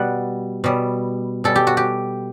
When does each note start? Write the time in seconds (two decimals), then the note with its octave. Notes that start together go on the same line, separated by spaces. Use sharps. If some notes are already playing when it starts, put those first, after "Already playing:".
Already playing: B2 G3 F#5
0.64 B2 G3
1.44 B2 G3 A4
1.56 G4
1.67 F#4
1.77 G4